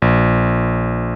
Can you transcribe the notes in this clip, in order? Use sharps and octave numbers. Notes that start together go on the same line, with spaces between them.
A#1